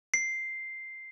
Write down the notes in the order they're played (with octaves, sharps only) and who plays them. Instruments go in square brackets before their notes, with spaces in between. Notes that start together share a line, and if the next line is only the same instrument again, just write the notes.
[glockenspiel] C7